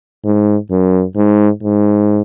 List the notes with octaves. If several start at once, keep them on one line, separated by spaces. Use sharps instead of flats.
G#2
F#2
G#2
G#2